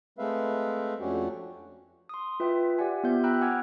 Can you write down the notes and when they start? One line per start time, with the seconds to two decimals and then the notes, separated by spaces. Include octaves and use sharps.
0.19 G#3 A3 C4 B4 E5 F5
1.00 F2 A3 C#4 D4 F#4 G4
2.09 C6 D#6
2.40 F4 B4 E5 G5
2.79 G4 D5 E5 F#5 G#5
3.04 B3 F4 G4 C5 E5 G6
3.24 G5 A#5 B5 E6 F#6
3.41 F#5 G#5 D6 E6 F6 G#6